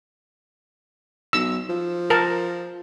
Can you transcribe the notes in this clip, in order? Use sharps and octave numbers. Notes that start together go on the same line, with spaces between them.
B1 E6
F3
A#4 A5